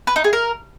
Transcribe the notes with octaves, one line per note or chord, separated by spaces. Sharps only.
B4
D#4
G#4
A#4